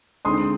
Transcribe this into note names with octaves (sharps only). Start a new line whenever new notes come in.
D3 G#3 C4 D#4 C6 D#6